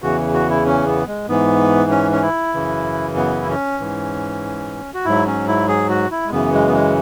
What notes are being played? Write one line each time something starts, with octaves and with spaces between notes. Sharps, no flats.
E2 C#3 E3 F#4
F#4
E4
C#4
B3
G#3
G#2 E3 B3
C#4
C#4
E4
F#2 C#3 E3
B3
E4
C#4
G#2 E3
F#4
G#2 F#3 E4
C#4
E4
G#4
F#4
E4
G#3
F#2 C#3 E3 B3
G#3
B3
G#3